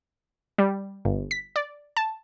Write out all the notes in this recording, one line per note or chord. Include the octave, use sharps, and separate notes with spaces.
G3
G1
B6
D5
A5